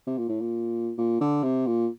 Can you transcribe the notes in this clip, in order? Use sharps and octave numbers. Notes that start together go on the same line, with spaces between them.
C3
A#2
A2
A#2
A#2
D3
C3
A#2